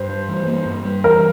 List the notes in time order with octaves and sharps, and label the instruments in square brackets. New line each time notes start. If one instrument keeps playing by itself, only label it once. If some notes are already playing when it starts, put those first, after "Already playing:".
Already playing: [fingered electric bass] G2 [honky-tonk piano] C5
[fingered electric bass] G3
E3
A#3
G2
G3
[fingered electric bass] E3 [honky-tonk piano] A#4